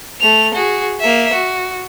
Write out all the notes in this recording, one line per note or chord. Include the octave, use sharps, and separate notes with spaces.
A3 F7
F#4 G#4
A#3 E5
F#4